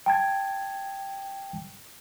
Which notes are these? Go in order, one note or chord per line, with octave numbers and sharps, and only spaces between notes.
G5 A5 G#6